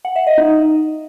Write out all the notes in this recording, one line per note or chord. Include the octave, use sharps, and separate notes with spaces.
F#5
E5
D#5
D#4